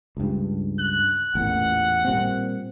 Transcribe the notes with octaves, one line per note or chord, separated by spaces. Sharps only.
C#2 G2
F#6
A1 E2 A#2 F#5
A#2 G3 C4